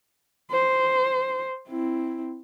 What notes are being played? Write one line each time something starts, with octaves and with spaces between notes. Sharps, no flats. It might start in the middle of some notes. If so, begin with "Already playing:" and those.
C5
C4 E4